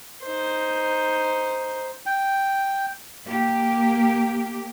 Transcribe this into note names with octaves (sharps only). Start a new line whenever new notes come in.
D#4 C5
G5
A#3 G4